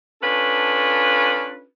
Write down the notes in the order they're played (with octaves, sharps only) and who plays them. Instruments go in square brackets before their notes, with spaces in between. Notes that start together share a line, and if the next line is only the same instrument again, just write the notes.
[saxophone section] C#4 D4 F4 A4 B4